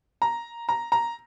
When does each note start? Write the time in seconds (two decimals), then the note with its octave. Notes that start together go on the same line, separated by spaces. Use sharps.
0.22 A#5
0.69 A#5
0.92 A#5